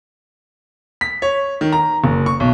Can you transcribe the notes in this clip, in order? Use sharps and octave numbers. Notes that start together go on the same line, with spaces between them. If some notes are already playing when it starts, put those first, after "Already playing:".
B6
C#5
D#3
A#5
F#1
C#6
B1